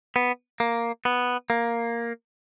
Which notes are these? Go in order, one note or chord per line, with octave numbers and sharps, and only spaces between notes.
B3
A#3
B3
A#3